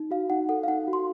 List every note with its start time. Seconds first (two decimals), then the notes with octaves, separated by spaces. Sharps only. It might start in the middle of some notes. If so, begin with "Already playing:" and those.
Already playing: D#4
0.11 F#4 F5
0.30 D#4 F#5
0.49 A4 F#5
0.63 F5
0.68 D#4 F#5
0.88 F#4
0.93 C6